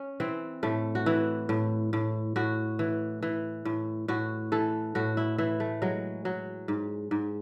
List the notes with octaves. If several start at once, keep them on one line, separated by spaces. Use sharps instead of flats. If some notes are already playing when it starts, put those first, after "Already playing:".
Already playing: C#4
E3 C4
A2 A3
F#4
E3 E4
A2
A2
A2 F#4
E3
E3
A2
A2 F#4
E3 A4
A2 F#4
E4
E3 E4
A3
F#3 G#3
F#3
G#2
G#2